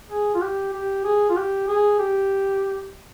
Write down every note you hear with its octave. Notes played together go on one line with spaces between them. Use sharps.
G#4
F4
G4
G4
G#4
F4
G4
G#4
G4